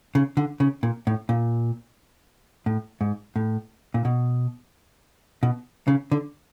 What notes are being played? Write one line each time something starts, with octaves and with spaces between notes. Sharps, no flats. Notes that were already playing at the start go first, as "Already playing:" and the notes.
C#3
D3
C#3
A#2
A2
A#2
A2
G#2
A2
A#2
B2
B2
C#3
D3